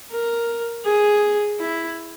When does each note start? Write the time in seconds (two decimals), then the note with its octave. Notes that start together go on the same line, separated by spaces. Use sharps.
0.11 A#4
0.85 G#4
1.60 E4